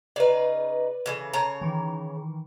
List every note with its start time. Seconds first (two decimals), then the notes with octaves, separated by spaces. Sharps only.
0.16 C#3 D#4 B4 D5
1.06 C#3 E3 A4
1.33 C#3 C#5 A5 A#5
1.61 D#3 E3